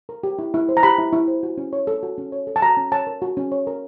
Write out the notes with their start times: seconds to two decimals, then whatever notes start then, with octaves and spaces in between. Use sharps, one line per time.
0.09 A#4
0.23 G4
0.39 E4
0.54 E4
0.69 C5
0.77 A#5
0.83 G4 B5
0.98 E4
1.13 E4
1.28 C5
1.43 F#4
1.58 C#4
1.73 C#5
1.87 A4
2.03 F#4
2.18 C#4
2.32 C#5
2.47 A4
2.56 A5
2.62 F#4 A#5
2.77 C#4
2.92 C#5 A5
3.07 A#4
3.22 F#4
3.37 C#4
3.52 C#5
3.67 A#4